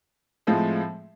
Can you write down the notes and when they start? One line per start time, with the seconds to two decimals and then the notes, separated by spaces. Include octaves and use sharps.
0.47 A2 F3 G#3 C4